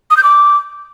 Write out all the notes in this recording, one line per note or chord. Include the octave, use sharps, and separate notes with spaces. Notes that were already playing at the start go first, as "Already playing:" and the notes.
D#6
G6
D6